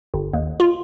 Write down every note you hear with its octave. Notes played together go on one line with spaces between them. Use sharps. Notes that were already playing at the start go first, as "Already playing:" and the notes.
G1
D#2
F4